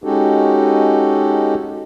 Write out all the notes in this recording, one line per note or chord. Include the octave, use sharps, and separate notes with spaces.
G#3 C#4 D#4 F#4 G4 A4